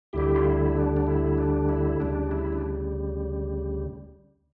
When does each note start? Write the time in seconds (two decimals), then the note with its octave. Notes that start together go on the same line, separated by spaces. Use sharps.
0.13 D2 D3 G3 E4 G4
0.36 F4
0.44 E4
0.75 D4
0.97 D4
1.07 E4
1.38 D4
1.69 E4
2.00 D2 C#3 G3 D4
2.31 E4
2.52 D4